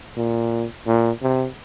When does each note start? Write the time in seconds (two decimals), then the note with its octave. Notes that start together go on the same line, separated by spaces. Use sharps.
0.17 A#2
0.87 A#2
1.22 C3